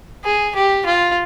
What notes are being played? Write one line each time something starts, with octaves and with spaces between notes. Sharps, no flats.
G#4
G4
F4